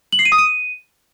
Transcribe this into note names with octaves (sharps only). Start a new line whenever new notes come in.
F#7
C7
D#7
D#6
D#7